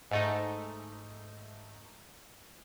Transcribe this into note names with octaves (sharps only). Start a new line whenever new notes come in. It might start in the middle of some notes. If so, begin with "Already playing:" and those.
G#2 A3 D#4